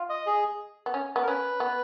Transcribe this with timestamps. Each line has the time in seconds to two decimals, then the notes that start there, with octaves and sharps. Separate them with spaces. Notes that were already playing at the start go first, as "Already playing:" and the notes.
Already playing: F4
0.09 D#5
0.26 G#4
0.86 B3
0.94 C#4
1.16 B3
1.23 A#4
1.27 C#4 B4
1.60 B3